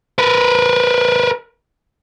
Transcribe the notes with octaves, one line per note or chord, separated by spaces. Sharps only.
A#4 B4